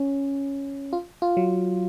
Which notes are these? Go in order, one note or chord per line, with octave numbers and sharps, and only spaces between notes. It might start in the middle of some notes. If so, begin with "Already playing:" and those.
Already playing: C#4
F4
F4
F#3